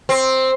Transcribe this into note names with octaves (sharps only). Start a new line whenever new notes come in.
C4